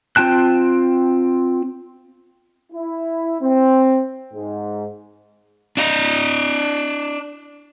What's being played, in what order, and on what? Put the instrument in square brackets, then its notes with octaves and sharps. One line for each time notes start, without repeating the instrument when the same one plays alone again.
[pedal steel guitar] C4 F4 G5 A5 F#6
[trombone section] E4
C4
G#2
[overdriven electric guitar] D4 D#5